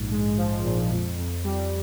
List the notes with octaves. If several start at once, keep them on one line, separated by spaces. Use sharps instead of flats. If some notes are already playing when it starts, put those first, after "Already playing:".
Already playing: A#1 G#2
G#3
F3
A#2
F2
F2
G3